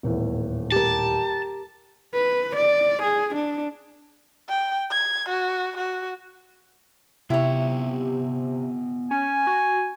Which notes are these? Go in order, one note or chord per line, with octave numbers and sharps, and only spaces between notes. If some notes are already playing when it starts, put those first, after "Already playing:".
D#1 E2 A2
G4 A#4 A5
B4
D5
G#4
D4
G5
G#6
F#4
F#4
C3 B3 E4 F4 C#5 G5
C#4 G#5
F#4